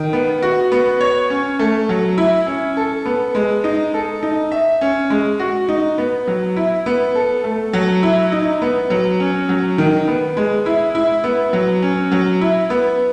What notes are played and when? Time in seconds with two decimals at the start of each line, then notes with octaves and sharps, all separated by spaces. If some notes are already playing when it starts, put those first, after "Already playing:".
Already playing: D#3
0.13 B3
0.42 F#4
0.72 B3
1.01 C#5
1.30 C#4
1.59 A3
1.89 F#3
2.18 E4
2.47 C#4
2.77 A4
3.05 B3
3.35 G#3
3.64 D#4
3.94 A4
4.23 D#4
4.51 E5
4.81 C#4
5.10 G#3
5.40 F#4
5.69 D#4
5.98 B3
6.28 F#3
6.56 E4
6.86 B3
7.15 A4
7.44 A3
7.73 F#3
8.03 E4
8.32 D#4
8.62 B3
8.90 F#3
9.20 C#4
9.49 F#3
9.78 D#3
10.08 B3
10.37 G#3
10.66 E4
10.95 E4
11.24 B3
11.53 F#3
11.82 C#4
12.12 F#3
12.41 E4
12.70 B3